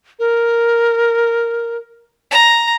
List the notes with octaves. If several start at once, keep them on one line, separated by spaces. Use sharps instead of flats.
A#4
A#5